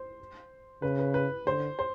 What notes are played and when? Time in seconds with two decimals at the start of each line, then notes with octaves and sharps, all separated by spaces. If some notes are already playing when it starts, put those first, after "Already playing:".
Already playing: C5
0.82 C#3 B4
0.99 B4
1.14 B4
1.46 D3 C5
1.79 C5